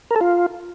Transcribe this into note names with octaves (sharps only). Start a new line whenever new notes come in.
A#4
A4
F4